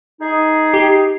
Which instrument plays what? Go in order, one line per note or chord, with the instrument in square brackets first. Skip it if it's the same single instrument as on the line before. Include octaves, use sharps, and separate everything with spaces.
[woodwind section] D#4 G#4
[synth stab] G4 C7